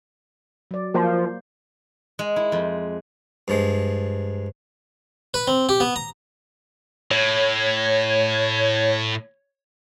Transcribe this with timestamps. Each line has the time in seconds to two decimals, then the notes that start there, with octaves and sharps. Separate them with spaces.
0.71 F#3 D5
0.94 F3 A#3 C5
2.19 G#3
2.36 E4
2.52 F2
3.48 G2 F3 G#3
5.34 B4
5.48 C4
5.69 G4
5.80 B3
5.96 A#5
7.11 A2 C#5